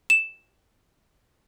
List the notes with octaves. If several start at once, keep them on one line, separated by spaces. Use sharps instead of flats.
E7